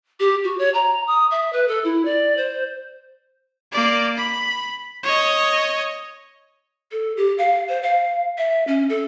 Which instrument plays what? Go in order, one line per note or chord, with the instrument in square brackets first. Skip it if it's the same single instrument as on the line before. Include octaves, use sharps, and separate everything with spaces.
[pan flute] G4
F#4
C#5
A#5
D#6
E5
B4
A4
E4
D5
C5
[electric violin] A#3 D5
B5
C#5 D#5
[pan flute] A4
G4
F5
C5
F5
E5
C#4
A4